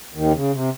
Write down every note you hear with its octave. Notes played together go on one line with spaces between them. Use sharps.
D#2 D#3
C#3
C3